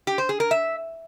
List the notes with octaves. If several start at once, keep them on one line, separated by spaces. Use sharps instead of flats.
G4
C5
G#4
A#4
E5